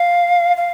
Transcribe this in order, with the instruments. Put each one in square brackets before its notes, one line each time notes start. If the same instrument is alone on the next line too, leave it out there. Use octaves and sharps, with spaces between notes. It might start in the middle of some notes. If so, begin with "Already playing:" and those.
Already playing: [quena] F5
F5